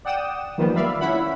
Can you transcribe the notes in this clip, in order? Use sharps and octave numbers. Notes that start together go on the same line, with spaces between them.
D5 F#5 G5 D#6 E7
D#3 F3 G3 A#3 B3
D5 E5 F5 B5
C#4 E4 E5 F#5 B5